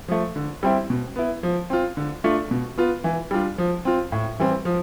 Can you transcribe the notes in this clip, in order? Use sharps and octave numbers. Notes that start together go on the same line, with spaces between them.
F3 A3
D3
G3 C4 E4
B2
B3 E4
F3
C4 F4
D3
A3 D4 F4
B2
B3 F4
E3
G3 D4 F4
F3
C4 F4
A2
E3 G3 C4
F3